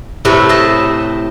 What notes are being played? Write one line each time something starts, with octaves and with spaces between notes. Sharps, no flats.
A2 C3 A3 C4 B4 C#5
C5 D#5 E5 A5